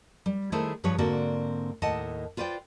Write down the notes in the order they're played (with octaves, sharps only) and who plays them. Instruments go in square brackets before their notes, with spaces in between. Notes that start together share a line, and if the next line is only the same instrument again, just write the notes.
[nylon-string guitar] G3
D#3 A3 E4 G#4 A4 C5
G2 F3 G#4 B4 C#5
G#2 D3 A#3 C4 F#4 D5
D#2 A2 D#5 F#5 A5
F4 B4 C5 D5 G5